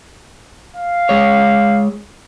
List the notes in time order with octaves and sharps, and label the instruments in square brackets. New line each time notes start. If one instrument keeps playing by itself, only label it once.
[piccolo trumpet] F5
[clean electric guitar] G#3 C#5